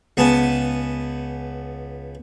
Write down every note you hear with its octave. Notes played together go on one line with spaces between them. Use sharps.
C#2 B3 G#5 A5